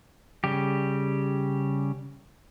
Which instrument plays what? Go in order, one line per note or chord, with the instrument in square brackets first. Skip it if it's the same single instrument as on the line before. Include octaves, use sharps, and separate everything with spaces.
[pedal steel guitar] C#3 G3 G4